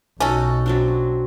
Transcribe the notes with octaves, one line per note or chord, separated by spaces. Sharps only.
B1 C#4 D#4 F#4 A4
F#3 C4 D4